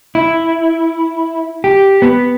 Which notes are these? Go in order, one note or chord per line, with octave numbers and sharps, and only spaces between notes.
E4
G4
B3